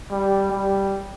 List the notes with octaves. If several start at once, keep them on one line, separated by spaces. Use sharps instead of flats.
G3
G3